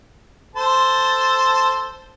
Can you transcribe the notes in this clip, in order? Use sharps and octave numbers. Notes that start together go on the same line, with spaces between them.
A4 C5 A5